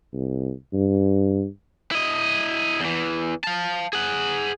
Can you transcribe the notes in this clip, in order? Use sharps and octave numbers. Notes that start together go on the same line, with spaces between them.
C2
G2
E4 D#5
E2 E3
F5 A5
G#4 F#5